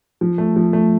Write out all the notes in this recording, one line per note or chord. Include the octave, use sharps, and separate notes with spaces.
F3
A3
F3
A3